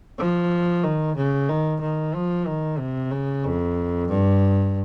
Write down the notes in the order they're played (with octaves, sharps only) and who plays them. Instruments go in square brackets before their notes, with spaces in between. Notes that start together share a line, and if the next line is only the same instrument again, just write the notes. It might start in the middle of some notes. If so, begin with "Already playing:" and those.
[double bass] F3
D#3
C#3
D#3
D#3
F3
D#3
C3
C#3
F2
G2